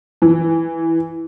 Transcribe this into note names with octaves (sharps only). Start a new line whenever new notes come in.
E3